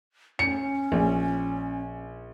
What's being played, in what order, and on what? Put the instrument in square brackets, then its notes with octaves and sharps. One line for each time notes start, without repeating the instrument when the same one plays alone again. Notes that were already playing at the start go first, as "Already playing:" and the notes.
[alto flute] C#4 [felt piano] C#7
[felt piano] A#1